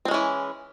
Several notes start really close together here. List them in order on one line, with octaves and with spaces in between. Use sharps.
C4 G#3 C#4 E3